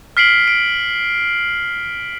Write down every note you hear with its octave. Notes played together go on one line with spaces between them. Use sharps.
F6 B6 C7 D7 F#7 G7
D7